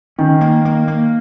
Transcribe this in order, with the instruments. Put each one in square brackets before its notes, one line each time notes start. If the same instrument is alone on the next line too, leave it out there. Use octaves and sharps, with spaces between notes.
[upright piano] D#3 [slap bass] C#4
[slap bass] A#3
A#3
A#3